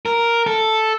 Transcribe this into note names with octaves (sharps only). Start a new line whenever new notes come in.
A#4
A4